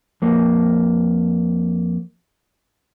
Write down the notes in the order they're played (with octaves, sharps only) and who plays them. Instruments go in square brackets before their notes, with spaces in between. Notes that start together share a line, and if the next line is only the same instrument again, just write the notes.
[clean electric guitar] F2 A#3